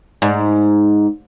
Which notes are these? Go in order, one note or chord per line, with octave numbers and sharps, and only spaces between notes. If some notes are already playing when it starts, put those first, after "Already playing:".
G#2